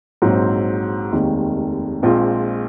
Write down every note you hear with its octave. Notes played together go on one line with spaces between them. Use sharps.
A#1 G#2 F#3 C4
F1 D#2 D#3 G#3
A#1 A#2 G#3 C4 F4